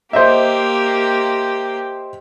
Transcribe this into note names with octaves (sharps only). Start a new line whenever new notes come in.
A#3 G4 C5 D#5 E5